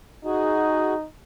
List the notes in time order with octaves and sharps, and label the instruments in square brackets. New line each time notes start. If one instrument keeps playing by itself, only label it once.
[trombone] D#4 [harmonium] F#4 G#4